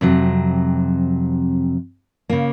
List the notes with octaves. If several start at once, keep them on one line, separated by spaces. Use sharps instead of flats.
F2 C3 F#3
C#3 A#3